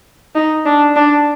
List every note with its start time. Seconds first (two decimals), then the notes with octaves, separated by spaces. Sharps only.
0.35 D#4
0.65 D4
0.96 D4